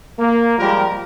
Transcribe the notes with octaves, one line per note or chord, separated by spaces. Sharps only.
A#3
F3 G3 G#3 F4 G4 A#4